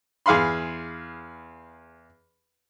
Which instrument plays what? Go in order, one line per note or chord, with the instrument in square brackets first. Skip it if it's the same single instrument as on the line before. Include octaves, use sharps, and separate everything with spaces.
[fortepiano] E2 G#4 F5 B5 C6